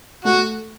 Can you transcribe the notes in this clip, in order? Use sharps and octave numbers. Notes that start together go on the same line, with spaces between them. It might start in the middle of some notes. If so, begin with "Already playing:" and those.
A3 F#4